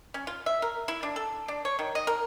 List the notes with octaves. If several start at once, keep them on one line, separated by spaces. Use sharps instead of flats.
C#4
F4
E5
A#4
E4
D4
A4
D4
C#5
D#3
D#5
A#4